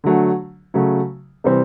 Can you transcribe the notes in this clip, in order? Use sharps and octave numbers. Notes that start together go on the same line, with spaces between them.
D3 F#3 A3
C#3 F#3 A3
C3 E3 G3 C4